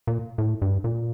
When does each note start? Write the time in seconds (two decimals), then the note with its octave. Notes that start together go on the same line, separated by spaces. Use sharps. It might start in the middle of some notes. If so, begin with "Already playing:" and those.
0.07 A#2
0.38 A2
0.62 G2
0.84 A#2